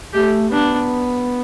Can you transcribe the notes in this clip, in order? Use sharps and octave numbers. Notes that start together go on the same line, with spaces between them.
A3 G4
B3 D4